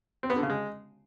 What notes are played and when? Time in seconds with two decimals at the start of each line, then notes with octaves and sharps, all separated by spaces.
0.23 C4
0.30 B3
0.36 D3
0.43 C#3
0.49 G#3